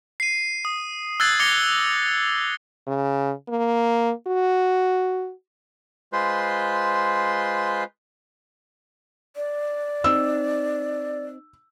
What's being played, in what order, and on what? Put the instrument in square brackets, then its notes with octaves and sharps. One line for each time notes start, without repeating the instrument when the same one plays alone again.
[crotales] C7 D#7
D#6
E6 F#6 G#6 A6 C7 F#7
D6 G#6 A#6 C#7 F7 G7
[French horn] C#3
A#3
F#4
[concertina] G#3 F4 B4 C5 C6
[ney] D5
[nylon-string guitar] C4 D#4 [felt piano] E6